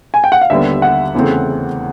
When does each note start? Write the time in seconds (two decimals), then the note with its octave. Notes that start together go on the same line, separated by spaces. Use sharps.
0.14 G#5
0.24 G5
0.32 F#5
0.41 F5
0.50 D#2 D3 G3 B3 E5
0.82 F#5
1.15 E2 C#3 E3 A3 C4